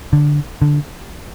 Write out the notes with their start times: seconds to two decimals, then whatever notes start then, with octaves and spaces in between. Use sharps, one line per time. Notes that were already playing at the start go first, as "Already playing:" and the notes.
0.13 D3
0.62 D3